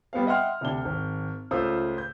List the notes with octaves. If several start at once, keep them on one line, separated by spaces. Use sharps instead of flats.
G3 B3 C4 F5
D#5 E5 F#5 G5 C6 F6
D2 C3 D4 G7
G#1
C#2 A3 F4 C5 D#6 E6
G6